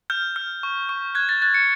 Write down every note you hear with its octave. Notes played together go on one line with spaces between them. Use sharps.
F6 G6
F6
C#6
C#6
F#6 G#6
A6
F#6 A6
C#7